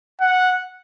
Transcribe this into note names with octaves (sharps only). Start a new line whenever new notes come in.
F#5